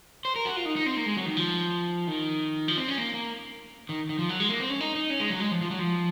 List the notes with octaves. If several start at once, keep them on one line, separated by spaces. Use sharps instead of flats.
C5
A#4
F#4
F4
D#4
D#4
C4
A#3
G#3
F#3
D#3
F3
D#3
F3
C4
C#4
A#3
A#3
D#3
D#3
F3
F#3
G#3
A#3
C4
C#4
D#4
D#4
C#4
G#3
F#3
G#3
F3
F3
F#3
F3